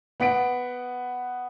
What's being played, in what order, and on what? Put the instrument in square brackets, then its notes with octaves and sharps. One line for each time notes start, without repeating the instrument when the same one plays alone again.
[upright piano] B3 F#5 B6 D7